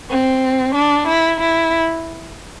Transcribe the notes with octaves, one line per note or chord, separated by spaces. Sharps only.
C4
D4
E4
E4